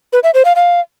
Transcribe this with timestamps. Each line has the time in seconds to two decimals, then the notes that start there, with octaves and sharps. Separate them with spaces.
0.13 B4
0.23 E5
0.34 C5
0.45 F5
0.56 F5